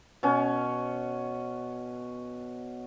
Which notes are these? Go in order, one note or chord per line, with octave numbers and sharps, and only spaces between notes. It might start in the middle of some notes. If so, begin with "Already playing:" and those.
B2 C#4